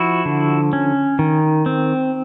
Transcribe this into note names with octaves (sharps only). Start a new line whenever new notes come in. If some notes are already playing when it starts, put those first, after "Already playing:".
Already playing: F3 E4 F#4
D3
C#4
D#3
C4